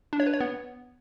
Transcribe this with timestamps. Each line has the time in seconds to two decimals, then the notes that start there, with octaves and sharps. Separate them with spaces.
0.13 D4
0.20 C#5
0.27 B4
0.34 C#5
0.40 B3